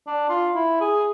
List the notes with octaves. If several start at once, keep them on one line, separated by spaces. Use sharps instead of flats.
D4
F4
E4
G#4